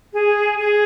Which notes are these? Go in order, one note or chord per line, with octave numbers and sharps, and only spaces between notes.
G#4
G#4